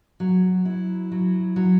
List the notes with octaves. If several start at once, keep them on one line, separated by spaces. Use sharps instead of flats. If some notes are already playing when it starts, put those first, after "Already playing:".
F#3
E4
F#3
F#3